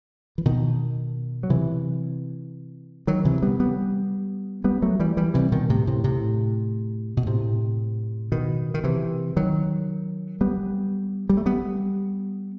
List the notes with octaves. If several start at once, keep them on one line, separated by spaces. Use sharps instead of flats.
E3
B2 D#3
F#3
C3 E3
D#3 F#3
C3 E3
G3 B3
G3 B3
G3 B3
F#3 A3
E3 G3
E3 G3
C3 E3
B2 D#3
A2 C3
A2 C3
A2 C3
B2
A2 C3
B2 D#3
D#3
C3 E3
D#3 F#3
G3 B3
G3
A3
G3 B3